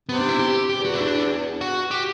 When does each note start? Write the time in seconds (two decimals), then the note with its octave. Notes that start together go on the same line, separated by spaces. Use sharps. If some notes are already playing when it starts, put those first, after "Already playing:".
0.09 C3 B3
0.19 D4
0.29 E4
0.39 G4
0.70 E2 G4
0.85 F#4
0.95 E4
1.00 D4
1.61 F#4
1.91 G4